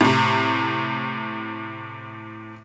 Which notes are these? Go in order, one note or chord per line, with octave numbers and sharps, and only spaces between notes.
A2 C3